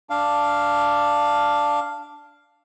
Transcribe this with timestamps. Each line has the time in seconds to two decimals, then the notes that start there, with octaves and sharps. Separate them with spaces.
0.10 D4 F5